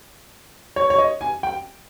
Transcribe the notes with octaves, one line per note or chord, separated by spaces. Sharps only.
C#5
C#5
D#5
G#5
G5